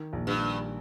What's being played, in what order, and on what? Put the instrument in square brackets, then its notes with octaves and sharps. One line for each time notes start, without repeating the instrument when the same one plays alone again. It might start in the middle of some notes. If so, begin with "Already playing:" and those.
Already playing: [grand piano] D#3
A#1
[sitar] G2
[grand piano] G3